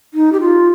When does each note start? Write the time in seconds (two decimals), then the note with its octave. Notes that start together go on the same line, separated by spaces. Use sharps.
0.14 D#4
0.33 G4
0.41 F4